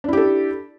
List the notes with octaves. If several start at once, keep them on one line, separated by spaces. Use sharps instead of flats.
D4 E4 G4 A4